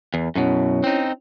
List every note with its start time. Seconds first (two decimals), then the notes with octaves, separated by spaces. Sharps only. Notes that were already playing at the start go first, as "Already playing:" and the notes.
0.14 E2
0.35 F#2 B2 C#4 E4 C#5
0.84 C4 D#4